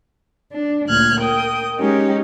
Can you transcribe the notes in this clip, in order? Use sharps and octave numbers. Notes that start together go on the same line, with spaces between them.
D4
D2 A#2 F6 F#6 G#6
A#4 G5 D#6
G#3 C#4 D#4 G4